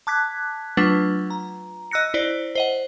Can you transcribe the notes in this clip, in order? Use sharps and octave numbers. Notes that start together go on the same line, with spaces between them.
A5 D6 F#6 G#6 B6
F#3 A3 D4 F4 B4 F#5
A#5
D#5 E6 F#6 A#6 C#7
E4 C5 D5
C5 D#5 F#5